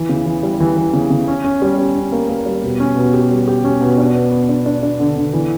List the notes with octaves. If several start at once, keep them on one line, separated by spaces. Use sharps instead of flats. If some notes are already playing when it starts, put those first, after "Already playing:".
Already playing: E3
C#3
E3
G3
E3
E3
C#3
C#3
C#4
C#4
G3
C#4
C#4
A#3
A#3
G3
B2
C#4
B2
G4
G3
G4
C#4
B2
D4
B3
B3
D4
D4
D4
D3
D3
E3